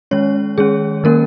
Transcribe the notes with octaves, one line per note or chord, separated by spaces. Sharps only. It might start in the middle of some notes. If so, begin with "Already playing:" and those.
D#3 G#3 C#4 C#5
D#3 G#3 C#4 G#4
D#3 F#3 A#3 C#4 A#4